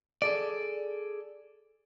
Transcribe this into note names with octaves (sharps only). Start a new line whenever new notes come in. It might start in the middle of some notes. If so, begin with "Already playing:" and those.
G#4 A4 D5